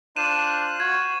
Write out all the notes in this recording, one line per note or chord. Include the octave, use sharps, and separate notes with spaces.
D4 F4 C5 F#6 D#7 E7
F#4 G#6